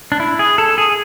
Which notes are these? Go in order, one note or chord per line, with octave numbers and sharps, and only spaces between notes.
D4
E4
G#4
A4
G#4